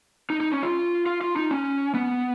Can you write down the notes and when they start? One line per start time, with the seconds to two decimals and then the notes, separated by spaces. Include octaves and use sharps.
0.30 D#4
0.40 D#4
0.52 C#4
0.62 F4
1.06 F4
1.21 F4
1.36 D#4
1.51 C#4
1.94 B3